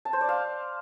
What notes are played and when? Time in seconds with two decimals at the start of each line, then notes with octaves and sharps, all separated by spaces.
0.05 A5
0.13 C5
0.21 D5
0.29 F5